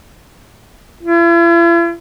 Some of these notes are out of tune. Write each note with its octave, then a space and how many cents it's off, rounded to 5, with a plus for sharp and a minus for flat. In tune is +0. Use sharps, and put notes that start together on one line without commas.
E4 +45